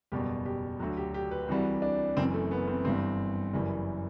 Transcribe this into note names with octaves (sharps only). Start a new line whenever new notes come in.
F#1 E2 B2 G3 G4
G4
D2 D3 F#3 F#4
G4
G4
B4
C2 C3 E3 G3 F#4
D4
F#1 F#2 E3 C4
A3
B3
C4
G1 G2 E3 G3 C4
F#1 F#2 E3 G3